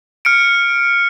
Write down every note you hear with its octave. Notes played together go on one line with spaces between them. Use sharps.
F6 C#7 D7